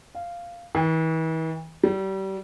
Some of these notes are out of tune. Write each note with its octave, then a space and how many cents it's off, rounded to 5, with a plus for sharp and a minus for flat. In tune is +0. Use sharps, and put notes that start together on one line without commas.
F5 -10
E3 -40
G3 -30